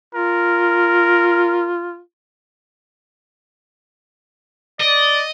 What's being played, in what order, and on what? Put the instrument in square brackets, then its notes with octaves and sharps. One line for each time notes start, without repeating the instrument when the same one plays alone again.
[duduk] F4 [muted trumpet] A#4
[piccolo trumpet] D5 [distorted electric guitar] D#5